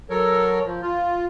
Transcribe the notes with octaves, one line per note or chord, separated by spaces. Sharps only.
F#3 A4 A#4 C#5
F3
F4